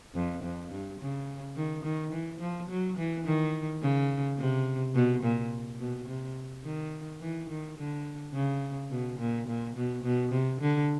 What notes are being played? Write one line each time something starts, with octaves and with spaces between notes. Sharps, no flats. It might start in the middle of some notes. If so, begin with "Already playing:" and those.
F2
F2
G2
C#3
D#3
D#3
E3
F3
F#3
E3
D#3
C#3
C3
B2
A#2
B2
C3
D#3
E3
D#3
D3
C#3
B2
A#2
A#2
B2
B2
C3
D3